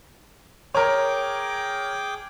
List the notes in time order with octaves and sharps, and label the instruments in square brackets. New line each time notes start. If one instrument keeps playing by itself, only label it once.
[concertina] G#4 G5 D6 [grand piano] A#4 C#5